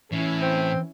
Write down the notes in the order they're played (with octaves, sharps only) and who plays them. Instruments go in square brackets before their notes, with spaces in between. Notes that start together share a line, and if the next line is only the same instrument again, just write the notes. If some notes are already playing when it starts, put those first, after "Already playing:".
[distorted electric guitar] A2 [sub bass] E3 [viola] C#4 E4
[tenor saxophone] C4